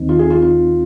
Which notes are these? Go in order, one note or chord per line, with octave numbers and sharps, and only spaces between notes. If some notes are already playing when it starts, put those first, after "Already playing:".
Already playing: D#2 D#3 C4 D#4
F4
G#4
F4
F4